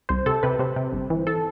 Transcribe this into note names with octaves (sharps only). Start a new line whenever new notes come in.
C2 C5
C3 A4
C3 B4
C3 C5
C3
G1
E3
E3 A4